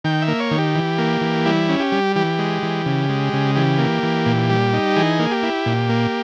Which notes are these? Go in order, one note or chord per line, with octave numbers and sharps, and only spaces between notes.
D#3 G5
E5
A#3
C#5
D#3
G4
E3
A#3
E3
G3 E4
C#4
G4
G3
E3 G4
G#3
E3
C#3
G#3
C#3
E3 G4
A#3
E3
A#2
G3
D#4
E3 G#4
A#3
G4
E4
A#2
A#3